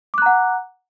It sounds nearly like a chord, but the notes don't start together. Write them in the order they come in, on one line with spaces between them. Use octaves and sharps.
D6 F#6 A#5 F#5